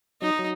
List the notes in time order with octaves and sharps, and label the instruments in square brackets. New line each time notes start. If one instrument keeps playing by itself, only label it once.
[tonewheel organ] F#3 [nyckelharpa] D#4
[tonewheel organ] F#3